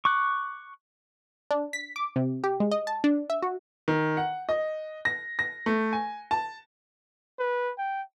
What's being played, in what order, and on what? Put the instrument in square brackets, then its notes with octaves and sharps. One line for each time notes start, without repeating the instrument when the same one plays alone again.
[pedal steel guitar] C#6 D6 F#6
[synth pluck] D4
B6
D6
C3
G4
G#3
D#5
A5
D4
E5
F#4
[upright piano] D#3
F#5
D#5
A#6
A#6
A3
G#5
A5
[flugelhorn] B4
G5